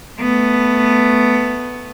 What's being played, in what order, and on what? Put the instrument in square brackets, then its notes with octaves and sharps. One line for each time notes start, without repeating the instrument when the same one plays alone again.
[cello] A3 B3